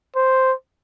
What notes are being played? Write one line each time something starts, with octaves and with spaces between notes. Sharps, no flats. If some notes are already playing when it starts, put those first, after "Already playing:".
C5